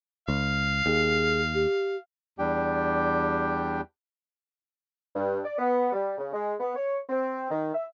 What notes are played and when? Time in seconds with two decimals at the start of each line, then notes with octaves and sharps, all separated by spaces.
0.28 C#2 F5
0.86 D#2 G#4
1.54 G4
2.39 E2 G3 D4 G4 G5
5.16 G2
5.44 D5
5.58 B3
5.93 G3
6.18 C#3
6.33 G#3
6.60 B3
6.76 C#5
7.09 C4
7.51 D#3
7.74 E5